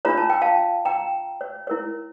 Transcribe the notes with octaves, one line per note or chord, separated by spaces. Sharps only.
D4 F4 C#5 A#5
A5
G5
F5 A5
G5 A#5
C#5
E4 A#4 C#5